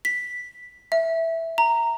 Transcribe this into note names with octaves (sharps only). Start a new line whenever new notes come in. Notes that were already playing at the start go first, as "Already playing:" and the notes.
B6
E5
A#5